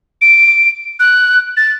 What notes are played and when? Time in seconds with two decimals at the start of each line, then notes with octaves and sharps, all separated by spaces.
0.22 D7
1.00 F#6
1.57 A6